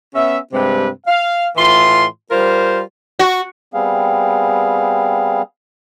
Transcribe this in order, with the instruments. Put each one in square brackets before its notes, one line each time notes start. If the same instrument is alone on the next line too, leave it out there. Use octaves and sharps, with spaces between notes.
[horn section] B3 C#4 E5
G2 C3 G#3 C4 B4
F5
A2 E3 F4 C6
G3 F4 A#4 C5
[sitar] F#4
[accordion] G3 B3 C4 G#4 F5